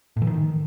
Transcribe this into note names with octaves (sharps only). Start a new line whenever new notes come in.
A2
E3
D#3